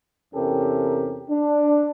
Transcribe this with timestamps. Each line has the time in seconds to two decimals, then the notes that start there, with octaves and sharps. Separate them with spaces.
0.34 E2 C3 C#4 G4 A4 A#4
1.30 D4